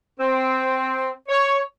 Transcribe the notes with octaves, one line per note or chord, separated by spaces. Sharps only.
C4
C#5